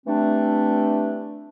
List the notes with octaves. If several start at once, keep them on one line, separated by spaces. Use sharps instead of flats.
E3 G3 A3 C4 D4